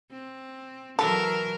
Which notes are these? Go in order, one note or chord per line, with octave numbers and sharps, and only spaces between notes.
C4
E3 F#3 A4 A#4